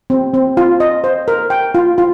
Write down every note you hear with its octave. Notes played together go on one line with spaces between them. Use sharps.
C4
C4
F4
D#5
C5
A#4
G5
F4
F4